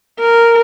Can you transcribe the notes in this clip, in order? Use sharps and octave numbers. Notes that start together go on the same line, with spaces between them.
A#4